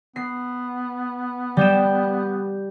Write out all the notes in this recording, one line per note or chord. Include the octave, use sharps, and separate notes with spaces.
B3 C7
G3 G5 E7